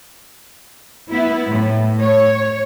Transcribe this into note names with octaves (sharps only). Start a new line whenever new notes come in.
B3 E4
A2
C#5